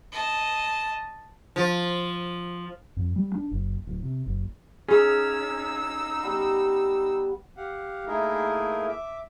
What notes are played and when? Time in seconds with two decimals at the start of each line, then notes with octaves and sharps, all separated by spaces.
0.12 D#5 A5
1.56 F3
2.97 F2
3.16 G3
3.35 D4
3.51 F#1
3.87 D1
4.03 C3
4.26 F#1
4.89 C#4 D#4 G#4 E6
6.23 G3 B3 D5
7.57 G4 F5 F#5
8.07 A3 A#3 D#4 E4 G#4 A#4
8.88 E5 D6